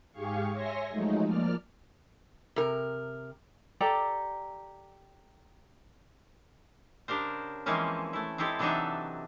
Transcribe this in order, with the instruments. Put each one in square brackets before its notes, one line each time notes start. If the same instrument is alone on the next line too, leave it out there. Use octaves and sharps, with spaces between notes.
[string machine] G#2 G4 G#4 F5 C#6
C#5 E5 G#5 C6 C#6 A#6
F3 F#3 G#3 A3 D#4
F3 A#3 D5 F6
[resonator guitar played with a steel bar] C3 A#4
[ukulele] G4 A4 D5 A#5
[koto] C#3 D4 G4 A#4 C5
E3 F3 G#3 A#3 C4 C#4
A3 E4
G#3 C4 E4 G4 A4
C3 E3 F#3 D4 D#4 E5